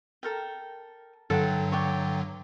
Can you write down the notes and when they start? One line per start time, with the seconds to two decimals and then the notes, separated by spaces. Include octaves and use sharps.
0.23 A4 A#4 G5
1.30 G2 D3 F#3 A4 F#5 G5
1.72 C#5 D5 G5